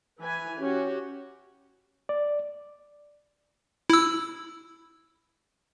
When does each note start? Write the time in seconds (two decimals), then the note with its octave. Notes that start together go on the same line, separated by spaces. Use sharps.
0.21 E3 B4 G#5
0.59 C#4 F#4 G4
2.09 D5
3.90 E4 E6